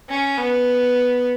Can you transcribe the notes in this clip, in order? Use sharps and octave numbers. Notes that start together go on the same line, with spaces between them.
C#4
B3